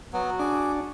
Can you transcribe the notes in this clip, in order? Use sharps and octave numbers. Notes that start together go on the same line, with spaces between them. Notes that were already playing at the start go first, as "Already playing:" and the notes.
F#3 B3 F#4
D4 G#4 D6